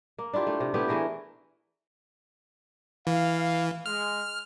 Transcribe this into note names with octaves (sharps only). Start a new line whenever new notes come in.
A#3
D4 E4 F4 G4
A3
C3
A3 B3 E4 G4
E3 A3 G#4 A#4
E3 F5
G#3 F6